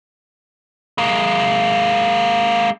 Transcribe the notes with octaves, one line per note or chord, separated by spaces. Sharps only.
G#3 A#3